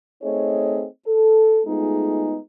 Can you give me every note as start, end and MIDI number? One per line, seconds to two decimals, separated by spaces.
0.22 0.85 57
0.22 0.85 60
0.22 0.85 63
0.22 0.85 68
0.22 0.85 73
0.22 0.85 75
1.06 1.60 69
1.67 2.38 56
1.67 2.38 57
1.67 2.38 59
1.67 2.38 63
1.67 2.38 65
1.67 2.38 68